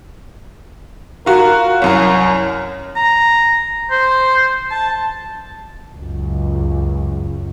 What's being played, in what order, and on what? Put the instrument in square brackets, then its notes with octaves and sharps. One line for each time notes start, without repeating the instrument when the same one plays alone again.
[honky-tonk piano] F4 F#4 [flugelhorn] A#4
[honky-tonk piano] C2 F#2 A#4 [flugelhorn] C#5
[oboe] A#5
C5
A5
[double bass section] C#2 F#2